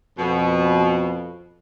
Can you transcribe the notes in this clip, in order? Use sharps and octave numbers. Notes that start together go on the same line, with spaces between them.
F2 B2